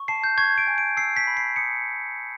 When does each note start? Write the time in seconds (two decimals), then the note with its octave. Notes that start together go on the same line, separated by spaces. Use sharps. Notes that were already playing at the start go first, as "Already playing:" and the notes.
Already playing: C#6
0.08 A5 C7
0.24 G6
0.38 C#6 G#6
0.58 D7
0.67 G#5
0.78 D7
0.97 E6 C7
1.17 B6
1.27 B5
1.37 C7
1.56 D#6 C#7